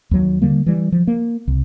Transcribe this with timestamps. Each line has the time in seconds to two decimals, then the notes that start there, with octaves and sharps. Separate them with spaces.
0.11 D#2 F#3
0.42 D3 G3 A#3
0.66 E3 G3
0.92 F3
1.07 A#3
1.48 C2